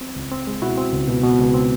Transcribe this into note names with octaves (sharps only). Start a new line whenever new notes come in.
C4
C#2
C4
G#3
B2 E4 F#4
C4
C#2
B2
B2
C#2
C4